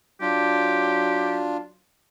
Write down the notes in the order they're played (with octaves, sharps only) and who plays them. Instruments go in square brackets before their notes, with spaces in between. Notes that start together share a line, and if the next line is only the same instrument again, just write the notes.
[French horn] F#3 [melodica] D4 F4 [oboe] G4